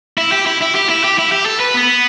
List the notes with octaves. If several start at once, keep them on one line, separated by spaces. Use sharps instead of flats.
E4
G4
E4
E4
G4
E4
G4
E4
G4
A4
B4
B3